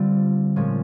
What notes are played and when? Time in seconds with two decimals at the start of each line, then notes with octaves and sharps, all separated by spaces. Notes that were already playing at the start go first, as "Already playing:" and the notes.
Already playing: D3 G3 C4 F4
0.56 A#2 F3 G#3 C#4